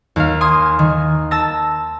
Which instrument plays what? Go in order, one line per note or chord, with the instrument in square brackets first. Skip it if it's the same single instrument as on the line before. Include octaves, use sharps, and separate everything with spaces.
[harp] D#2 F5
G#5 C6 D#6
D#3
A5 E6 A#6